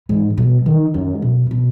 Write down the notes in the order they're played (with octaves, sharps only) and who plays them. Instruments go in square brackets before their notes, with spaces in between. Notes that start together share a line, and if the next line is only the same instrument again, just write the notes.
[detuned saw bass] G#2 [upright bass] E3
[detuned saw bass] B2 [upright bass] F#3
[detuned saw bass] D#3 [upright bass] E3
[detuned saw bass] F#2 [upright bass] D#3
[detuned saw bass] G#2
[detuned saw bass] F#2 [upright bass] B2
[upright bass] C#3
B2